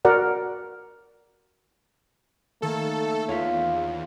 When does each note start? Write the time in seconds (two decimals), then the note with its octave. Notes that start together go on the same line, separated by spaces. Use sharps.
0.05 F#4 A#4 D5 F#5
2.62 D#3 A3 A#3 A4
3.28 E2 F4 C#5 F5 B6